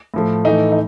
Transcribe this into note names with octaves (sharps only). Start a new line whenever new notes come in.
A2 F3 A3
A2 E3 A3 D#4
D#4